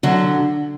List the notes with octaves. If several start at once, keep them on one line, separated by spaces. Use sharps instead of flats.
D3 F#3